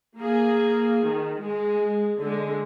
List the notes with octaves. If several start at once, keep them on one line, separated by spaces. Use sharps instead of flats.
A#3 G#4
D#3
G#3
D3 G#3